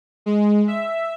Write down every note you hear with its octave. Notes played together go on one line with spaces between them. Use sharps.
G#3
E5